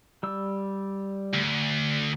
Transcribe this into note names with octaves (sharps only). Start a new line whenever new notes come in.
G3 E6
D2